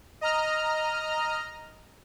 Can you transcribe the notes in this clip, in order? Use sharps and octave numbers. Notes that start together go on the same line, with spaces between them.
D#5 A#5 F6